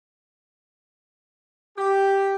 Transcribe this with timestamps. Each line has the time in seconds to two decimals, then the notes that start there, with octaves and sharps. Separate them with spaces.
1.78 G4